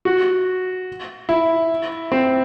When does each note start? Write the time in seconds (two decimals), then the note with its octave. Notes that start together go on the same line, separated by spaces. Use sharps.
0.05 F#4
1.29 E4
2.12 C4